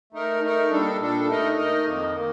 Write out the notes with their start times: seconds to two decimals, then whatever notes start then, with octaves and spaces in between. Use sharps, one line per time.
0.13 A3 D#4 A#4
0.42 A3 D#4 A#4
0.71 A#2 G3 D4 A4
0.99 A#2 G3 D4 A4
1.28 A3 D#4 A#4 D#5
1.57 A3 D#4 A#4 D#5
1.85 F2 D#3 A#3
2.14 D#3 A#3